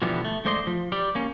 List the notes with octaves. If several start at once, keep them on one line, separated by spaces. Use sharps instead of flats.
B2 D3 E3 F3 G3 B3
A3
G#2 A3 C5 D5 D#5 C6
F3
G3 G4 D5
A#3 C#4